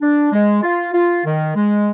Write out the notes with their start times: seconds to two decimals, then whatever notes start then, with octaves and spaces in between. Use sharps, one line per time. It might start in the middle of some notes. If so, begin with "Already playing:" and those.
0.01 D4
0.32 G#3
0.63 F4
0.93 F4
1.25 D#3
1.56 G#3